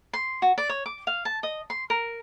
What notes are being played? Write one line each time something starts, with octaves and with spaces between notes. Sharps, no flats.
C6
F#4
D5
C#5
D6
F5
A5
D#5
C6
A#4